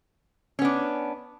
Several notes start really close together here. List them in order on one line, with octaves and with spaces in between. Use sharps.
C#4 B3 D4